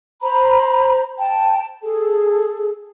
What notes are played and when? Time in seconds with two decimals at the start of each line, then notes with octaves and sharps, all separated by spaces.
0.22 C5 A#5 B5
1.19 G5 A5
1.83 G#4 A4